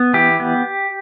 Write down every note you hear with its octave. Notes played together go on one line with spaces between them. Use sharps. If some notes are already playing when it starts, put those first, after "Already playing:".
Already playing: B3
E3 G4
B3